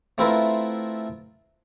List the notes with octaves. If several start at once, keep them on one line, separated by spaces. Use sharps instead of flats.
A3 C4 E4 F4 A#4 B4